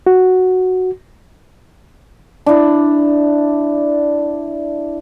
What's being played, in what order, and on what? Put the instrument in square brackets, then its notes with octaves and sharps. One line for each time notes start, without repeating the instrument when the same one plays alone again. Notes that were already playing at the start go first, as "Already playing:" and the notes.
[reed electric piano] F#4
[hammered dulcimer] D4 E4